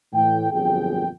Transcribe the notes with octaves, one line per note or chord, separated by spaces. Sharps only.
A2 E3 G5
G1 F2 A#2 F#3 G#4 G5